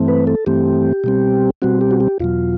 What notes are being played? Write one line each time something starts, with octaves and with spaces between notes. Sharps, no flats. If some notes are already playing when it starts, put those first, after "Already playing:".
Already playing: G2 E3 A3 C4
B4
A4
G2 E3 A3 C4 G4
B2 G3 C4
B2 G3 C4 F#4
G4
F#4
G4
E2 B2 F#3 F4